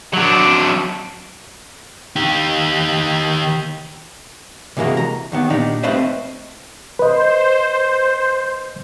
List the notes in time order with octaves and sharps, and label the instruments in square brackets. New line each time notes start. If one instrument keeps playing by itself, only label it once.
[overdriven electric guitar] F#3 D4
[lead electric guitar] D#3 G4
[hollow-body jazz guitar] C3 E3 G#3 A#3 F#4
A#5
D#2 D#3 B3
A#2 D4 D#4 G4
A3 C4 B4 C5 D#5 F5
[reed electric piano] B4 D#5 [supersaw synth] C5